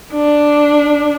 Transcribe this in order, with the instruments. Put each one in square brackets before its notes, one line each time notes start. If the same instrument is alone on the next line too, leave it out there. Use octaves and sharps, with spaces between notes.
[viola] D4